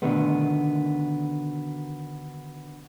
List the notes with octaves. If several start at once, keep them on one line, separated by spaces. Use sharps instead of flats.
B2 D3 D#3 A3 B3